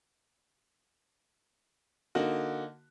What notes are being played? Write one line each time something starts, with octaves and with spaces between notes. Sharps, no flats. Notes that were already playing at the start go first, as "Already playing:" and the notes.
D3 A#3 D#4 F#4